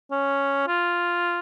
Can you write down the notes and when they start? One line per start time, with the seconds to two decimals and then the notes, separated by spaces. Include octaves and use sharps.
0.11 C#4
0.67 F4